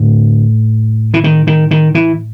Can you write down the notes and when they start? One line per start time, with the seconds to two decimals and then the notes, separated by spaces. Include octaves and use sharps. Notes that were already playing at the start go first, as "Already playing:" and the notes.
Already playing: A2 D3
1.14 E3
1.24 D#3
1.47 D#3
1.71 D#3
1.95 E3